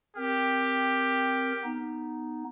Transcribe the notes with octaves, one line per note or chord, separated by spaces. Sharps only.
C4 G4 A#4
B3 D#4